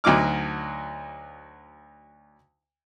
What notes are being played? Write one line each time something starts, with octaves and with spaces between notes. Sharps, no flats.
D2 F#3 D#4 D6 F6